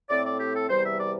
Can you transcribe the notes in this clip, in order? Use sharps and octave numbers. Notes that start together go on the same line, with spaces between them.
A2 A3 C4 D5
D5
G4
A4
E2 C3 G3 C5
E5
D5